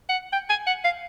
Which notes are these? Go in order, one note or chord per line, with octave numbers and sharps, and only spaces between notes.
F#5
G5
G#5
F#5
F5